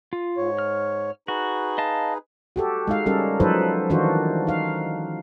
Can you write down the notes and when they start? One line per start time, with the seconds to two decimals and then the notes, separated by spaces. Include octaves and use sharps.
0.13 F4
0.37 G#2 C#5
0.59 F6
1.28 D#4 F#4 G#4 B4
1.78 D#5 F5 A5
2.56 F#4 G4 A4
2.88 G#3 D#4 F5
3.06 G3 C#4 A4 A#4
3.40 F3 F#3 D#4 A4 B4 C5
3.90 D#3 E3 D4 F4 F#4 C5
4.47 D#4 F5